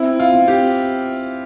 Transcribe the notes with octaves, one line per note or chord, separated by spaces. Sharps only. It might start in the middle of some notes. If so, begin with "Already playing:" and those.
Already playing: C4 E4
F4
C4
G4